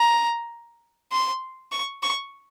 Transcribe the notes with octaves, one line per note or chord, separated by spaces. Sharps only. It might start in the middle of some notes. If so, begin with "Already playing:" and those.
Already playing: A#5
C6
C#6
C#6